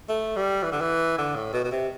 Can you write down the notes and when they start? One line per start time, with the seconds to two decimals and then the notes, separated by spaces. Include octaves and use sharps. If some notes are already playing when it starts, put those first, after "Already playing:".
0.09 A3
0.36 G3
0.63 E3
0.72 D3
0.81 E3
1.18 D3
1.35 A2
1.53 B2
1.64 B2
1.71 C3